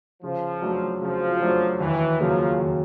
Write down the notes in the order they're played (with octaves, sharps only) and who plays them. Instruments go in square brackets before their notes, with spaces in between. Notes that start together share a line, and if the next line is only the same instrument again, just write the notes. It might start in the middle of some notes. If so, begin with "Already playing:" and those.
[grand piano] C#3 [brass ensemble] F3
[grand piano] F#3 A3 D4
[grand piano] C#3 [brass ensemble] F3
[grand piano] F#3 A3 D4
[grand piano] D#2 [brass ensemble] E3
[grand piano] C#3 F#3 A#3 C#4 [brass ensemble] F3
[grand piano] D#2